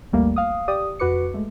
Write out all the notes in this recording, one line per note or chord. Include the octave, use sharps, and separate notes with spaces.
G#1 D#2 G3 A3 A#3
F5 D#6
G4 D5 D#6
F2 F#4 B4 D6 C#7
G#3 A3